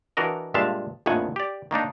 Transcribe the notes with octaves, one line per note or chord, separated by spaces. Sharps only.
E3 D4 F#4 A#4 D#5
G2 A#2 G#3 E5 F5 A5
A#1 F2 A2 D#3 F#5 G#5
G4 D5
D#3 A#3 D4 D#4